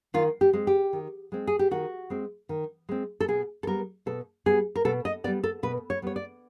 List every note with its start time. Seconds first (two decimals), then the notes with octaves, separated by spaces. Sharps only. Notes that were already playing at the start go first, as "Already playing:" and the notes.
0.14 D#3 F4
0.41 G4
0.53 G#3 C4
0.67 G4
0.93 D#3
1.32 G#3 C4
1.47 G#4
1.59 G4
1.71 D#3 F#4
2.10 G#3 C4
2.49 D#3
2.89 G#3 C4
3.20 A4
3.28 B2 G#4
3.63 A4
3.67 G3 B3 A#4
4.06 B2 A4
4.46 G3 B3 G#4
4.75 A#4
4.85 B2 A4
5.05 D#5
5.24 B3 D5
5.27 G3
5.43 A4
5.63 B2 B4
5.90 C#5
6.02 G3 B3 C#5
6.16 D5